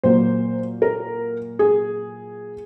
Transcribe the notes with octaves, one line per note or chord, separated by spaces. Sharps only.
A#2 F#3 A#3 C5
A#4
G#4